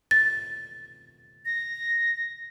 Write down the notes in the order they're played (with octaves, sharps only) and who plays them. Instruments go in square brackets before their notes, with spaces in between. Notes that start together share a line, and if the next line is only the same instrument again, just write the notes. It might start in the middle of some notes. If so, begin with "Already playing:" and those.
[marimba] A6
[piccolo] A#6